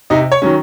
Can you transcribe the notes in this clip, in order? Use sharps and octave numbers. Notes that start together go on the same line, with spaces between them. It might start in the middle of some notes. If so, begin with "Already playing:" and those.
C3 D#4 D#5
C#5
D#3 F#3 C#4